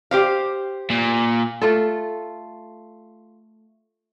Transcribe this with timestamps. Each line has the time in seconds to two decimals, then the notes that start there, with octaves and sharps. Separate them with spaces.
0.11 G4 C5 F5
0.90 A#2
1.62 A3 F4 A4